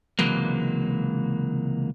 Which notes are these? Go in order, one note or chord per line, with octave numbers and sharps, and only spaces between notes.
C#2 C3 E3 F#3 G#3 A#3